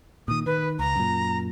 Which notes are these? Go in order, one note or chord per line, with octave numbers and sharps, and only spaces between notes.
A#2 D#3 D#6
D#3 B4
C#2 A#5
F#2 A#2